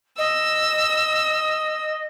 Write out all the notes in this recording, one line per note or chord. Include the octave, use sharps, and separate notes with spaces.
D#5 E6